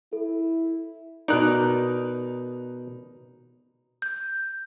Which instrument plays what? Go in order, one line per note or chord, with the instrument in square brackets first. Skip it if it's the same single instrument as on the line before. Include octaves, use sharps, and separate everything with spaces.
[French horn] E4 [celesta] A4
[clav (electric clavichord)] B2 A#4 D5 [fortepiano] D#4 F#6
[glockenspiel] G6